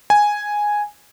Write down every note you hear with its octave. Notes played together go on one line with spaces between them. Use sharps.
G#5